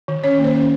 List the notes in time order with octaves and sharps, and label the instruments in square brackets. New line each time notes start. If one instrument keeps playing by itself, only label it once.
[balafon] D#3
C#4 C#5
A#3
C5
C#4